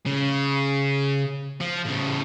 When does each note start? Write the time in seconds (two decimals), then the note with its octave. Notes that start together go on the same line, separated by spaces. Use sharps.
0.06 C#3
1.61 F3
1.86 A2 C#3